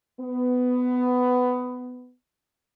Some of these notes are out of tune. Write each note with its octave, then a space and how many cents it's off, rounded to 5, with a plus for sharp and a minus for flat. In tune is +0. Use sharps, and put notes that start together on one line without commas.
B3 +15